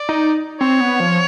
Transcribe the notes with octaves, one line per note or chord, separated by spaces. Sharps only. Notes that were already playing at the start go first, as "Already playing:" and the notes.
Already playing: D5
D#4
C4 C#5
B3
F3